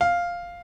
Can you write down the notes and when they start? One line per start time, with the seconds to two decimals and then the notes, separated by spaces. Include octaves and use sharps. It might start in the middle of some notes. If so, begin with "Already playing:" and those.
0.01 F5